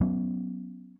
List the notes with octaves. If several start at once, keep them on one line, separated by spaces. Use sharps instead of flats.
F#3 B3 C#4